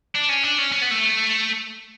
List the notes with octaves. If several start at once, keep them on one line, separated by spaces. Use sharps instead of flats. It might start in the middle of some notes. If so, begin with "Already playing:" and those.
D4
C#4
D4
C#4
C#4
B3
A3